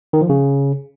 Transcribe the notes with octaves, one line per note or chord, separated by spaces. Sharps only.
D#3
F3
C#3